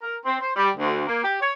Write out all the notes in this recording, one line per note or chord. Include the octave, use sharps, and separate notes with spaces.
A#4
C4
C5
G3
D2
A#3
G4
C#5